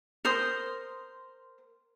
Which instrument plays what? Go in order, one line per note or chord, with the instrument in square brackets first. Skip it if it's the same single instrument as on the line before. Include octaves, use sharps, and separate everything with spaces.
[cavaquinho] A#4 C5 C6 D#6